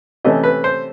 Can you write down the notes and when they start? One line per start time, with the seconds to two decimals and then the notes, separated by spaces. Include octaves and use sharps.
0.25 C3 E3 A3 C#4 D#5
0.43 B4
0.64 C5